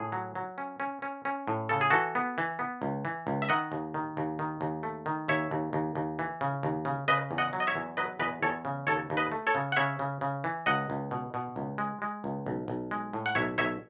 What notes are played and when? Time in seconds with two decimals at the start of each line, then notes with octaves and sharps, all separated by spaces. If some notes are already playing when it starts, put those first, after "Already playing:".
Already playing: A2 G#4
0.12 F#3
0.35 F#3
0.58 C#4
0.80 C#4
1.02 C#4
1.25 C#4
1.48 A2
1.69 C#3 A4
1.81 G#4
1.90 E3 F#4 A4
2.15 B3
2.38 E3
2.59 B3
2.82 C#2
3.05 E3
3.27 C#2
3.42 E5
3.49 D#3 D#5 F#5
3.72 D#2
3.94 D#3
4.17 D#2
4.39 D#3
4.61 D#2
4.83 A3
5.06 D#3
5.28 D#2 C#5 E5
5.51 D#2
5.73 D#2
5.95 D#2
6.19 E3
6.41 C#3
6.63 D#2
6.85 C#3
7.08 C#3 B4 D#5
7.31 E2
7.38 D#5 F#5
7.53 F#3
7.60 D#5
7.67 C#5 E5
7.76 E2
7.97 F#3 B4 D#5
8.19 E2 B4 D#5
8.42 E2 A4 C#5
8.65 C#3
8.87 D#2 A4 C#5
9.10 D#2
9.17 B4 D#5
9.32 A3
9.47 A4 C#5
9.55 C#3
9.72 F#5
9.76 C#3 C#5 E5
9.99 C#3
10.21 C#3
10.44 E3
10.66 C#2 D#5 F#5
10.90 C#2
11.11 B2
11.34 B2
11.56 C#2
11.78 G#3
12.02 G#3
12.24 C#2
12.46 B1
12.68 B1
12.91 G#3
13.13 A2
13.26 F#5
13.35 B1 C#5 E5
13.58 B1 C#5 E5